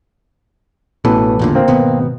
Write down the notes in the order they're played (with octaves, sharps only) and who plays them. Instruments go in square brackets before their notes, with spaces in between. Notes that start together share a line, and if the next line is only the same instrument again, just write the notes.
[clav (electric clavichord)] A1 A4 B4 [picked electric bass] B2 E3
[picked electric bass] E2 A#2 D3
[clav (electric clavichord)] A#3 C4
[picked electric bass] G#1 B2 B3